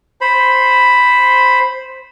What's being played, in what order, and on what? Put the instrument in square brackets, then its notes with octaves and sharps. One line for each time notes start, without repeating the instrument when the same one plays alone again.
[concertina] C5 B5